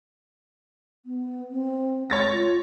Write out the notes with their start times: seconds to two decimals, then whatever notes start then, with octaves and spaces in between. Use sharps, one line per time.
1.06 B3
1.51 C4
2.10 G#3 C#5 A6 A#6
2.32 F4